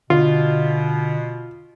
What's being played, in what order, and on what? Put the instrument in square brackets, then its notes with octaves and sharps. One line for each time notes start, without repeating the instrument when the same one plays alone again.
[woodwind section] B2 [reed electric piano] D3 [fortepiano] F4